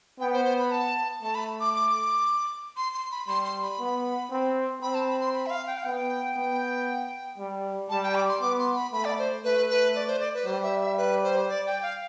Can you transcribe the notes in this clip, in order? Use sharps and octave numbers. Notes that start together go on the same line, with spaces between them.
B3 G5
C5
C5
B5
A5
A3 A5
B5
D6
D6
C6
C6
B5
G3 C6
C6
B5
B3
C4
C4 B5
A5
B5
C6
B5
E5
F5
G5
F5
B3 G5
B3
G3
G3 A5
G5
D6
C6
B3 D6
C6
B5
A3 B5
D5
C5
A3 B4
B4
D5
C5
D5
B4
G3 C5
E5
E5
B4
C5
D5
G5
F5